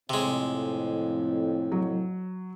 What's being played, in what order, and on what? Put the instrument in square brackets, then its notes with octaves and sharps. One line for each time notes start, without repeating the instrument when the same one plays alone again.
[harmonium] F2 A2 [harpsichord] C3 G#3
[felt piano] F#3